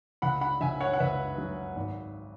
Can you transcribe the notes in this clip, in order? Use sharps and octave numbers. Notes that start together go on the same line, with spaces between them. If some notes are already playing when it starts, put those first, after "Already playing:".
C#2 F#5 B5
F#5 B5
C#2 E5 G#5
C#5 F#5
F#5
C#2 B4 E5
F#3
G#1